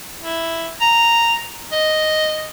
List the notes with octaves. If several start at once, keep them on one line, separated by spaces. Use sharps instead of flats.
E4
A#5
D#5